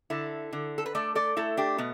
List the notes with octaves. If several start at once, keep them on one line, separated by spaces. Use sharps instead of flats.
D3 E4 A4
D3
A4
B4
A3 A4 D5
A4 D5
A3 E4 A4
D4 G4
B2 B3